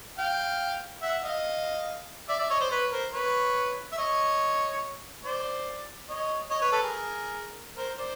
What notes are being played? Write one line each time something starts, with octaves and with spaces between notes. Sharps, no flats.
F5 G5
E5 F#5
D#5 F5
D5 E5
D5 E5
C#5 D#5
C5 D5
B4 C#5
A#4 C5
B4 C#5
E5
C#5 D#5
C5 D5
C#5 D#5
C#5 D#5
B4 C#5
A4 B4
G#4 A#4
A#4 C5
C5 D5